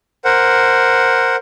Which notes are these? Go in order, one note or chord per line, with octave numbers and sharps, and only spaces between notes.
A#4 C5 F#5